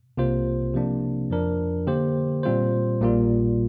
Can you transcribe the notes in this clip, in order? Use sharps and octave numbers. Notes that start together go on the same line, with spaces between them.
C2 C3 A#3 F4 C5
C3 F3 A#3 D4
F2 F3 D4 A#4
D3 A#3 G4 C5
A#2 G3 C4 F4 C5
A#1 A#2 G3 A#3 F4